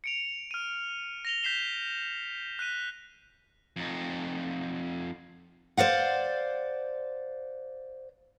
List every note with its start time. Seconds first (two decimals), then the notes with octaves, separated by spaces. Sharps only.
0.04 C#7 D7 F7
0.51 F6 D#7
1.25 A#6 F7 G7
1.43 G6 B6 C7 E7 G7
2.59 F#6 B6 D#7
3.76 F2 D#4
5.77 C5 D5 F5 F#5